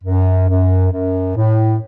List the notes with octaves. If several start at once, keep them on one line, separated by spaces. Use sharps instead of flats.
F#2
F#2
F#2
A2